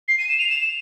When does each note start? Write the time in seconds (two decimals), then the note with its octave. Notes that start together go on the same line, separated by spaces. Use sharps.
0.08 C7
0.18 D#7
0.28 E7
0.38 F7
0.48 E7